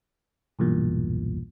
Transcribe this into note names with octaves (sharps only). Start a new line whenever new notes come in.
B1 E2 G2 A#2